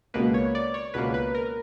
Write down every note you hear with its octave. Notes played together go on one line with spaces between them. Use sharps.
C#2 B2 A#3 B4
C#5
D5
C#5
C#2 B2 A#3 B4
B4
A#4